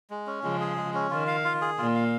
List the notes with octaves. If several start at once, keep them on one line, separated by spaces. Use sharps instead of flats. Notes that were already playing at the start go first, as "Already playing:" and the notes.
G#3
C#4
C#3 F3 G#3
G#4
G#3
C#4
D#3 F4
F5
F4
G#4
A#2 F4
F5